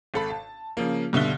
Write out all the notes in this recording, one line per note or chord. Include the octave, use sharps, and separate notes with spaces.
G#1 A4 B5
A5
C#3 F3 A#3
G2 B2 D3 E5 G7